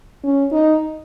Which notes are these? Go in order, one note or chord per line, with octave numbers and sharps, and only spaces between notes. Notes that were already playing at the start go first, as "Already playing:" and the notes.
C#4
D#4